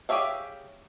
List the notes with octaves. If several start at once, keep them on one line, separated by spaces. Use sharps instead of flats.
G4 G#4 C#5 E5 F5